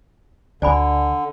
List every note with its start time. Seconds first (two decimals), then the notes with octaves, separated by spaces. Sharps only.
0.62 D2 D3 D5 G#5 B5